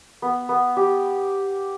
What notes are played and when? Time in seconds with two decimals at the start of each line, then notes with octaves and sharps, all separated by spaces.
0.22 B3
0.49 B3
0.77 G4